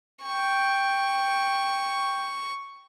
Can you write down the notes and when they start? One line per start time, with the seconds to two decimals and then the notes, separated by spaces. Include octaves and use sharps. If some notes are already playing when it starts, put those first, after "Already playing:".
0.23 G5 C#6